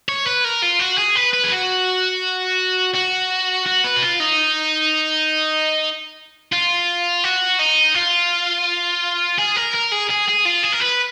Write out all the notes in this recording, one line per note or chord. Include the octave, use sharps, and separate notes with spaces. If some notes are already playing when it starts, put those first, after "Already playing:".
C#5
B4
A#4
F4
F#4
G#4
B4
B4
G#4
F#4
F#4
F#4
B4
F#4
F4
D#4
F4
F#4
D#4
F4
G#4
A#4
A#4
G#4
G#4
G#4
F4
G#4
A#4
B4